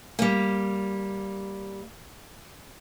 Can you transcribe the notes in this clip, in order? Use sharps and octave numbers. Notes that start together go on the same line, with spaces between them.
G3 A#3